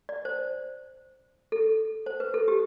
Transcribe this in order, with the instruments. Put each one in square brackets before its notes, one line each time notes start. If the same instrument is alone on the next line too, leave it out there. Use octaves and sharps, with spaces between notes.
[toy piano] D5
C5
A4
C5
B4
A4
G4